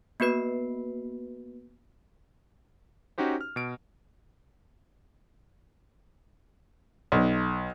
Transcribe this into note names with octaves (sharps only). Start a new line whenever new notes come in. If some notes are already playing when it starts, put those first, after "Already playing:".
A#3 B3 F#4 B4 C7
C#4 D#4 F#4 G4 C5
F6
B2 D7
B1